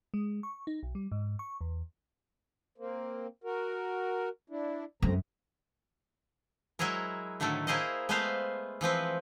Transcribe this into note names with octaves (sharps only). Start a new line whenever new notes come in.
G#3
C#6
D#4
B1
G3
G#2
C#6
E2
A#3 C4
F#4 A#4
D4 E4
F#2 A3 C4 A#5
F#3 G#3 E4 G#4 A#4
A2 D3 D#3 F#3 A3
A#3 E4 G#4 A#4 C5 D#5
G#3 A3 B3 B4 C5 F5
E3 F3 C4 B4